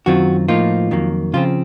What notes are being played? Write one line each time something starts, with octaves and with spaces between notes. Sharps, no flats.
F#2 D#3 F#3 C4 F4 F#4
A2 F3 A#3 D#4 F4
F2 D#3 F#3 A#3
C#3 F3 C4 F4